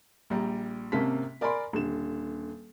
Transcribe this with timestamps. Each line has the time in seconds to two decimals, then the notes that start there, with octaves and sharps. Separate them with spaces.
0.30 A#1 G3 A#5
0.92 G#1 C3 A#3 C#4 A5 B6
1.41 A#4 D5 G#5 B5 C6
1.73 D#1 D3 E7